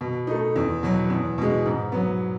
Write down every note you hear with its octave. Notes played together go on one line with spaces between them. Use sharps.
B2
A3 D#4
E2
B2 F#3
E2
B2 G#3
G#2
F#3 B3